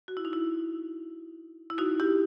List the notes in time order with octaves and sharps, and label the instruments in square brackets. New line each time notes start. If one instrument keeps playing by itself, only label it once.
[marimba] F#4
E4
D#4
E4
E4
D#4 F#4
E4 G4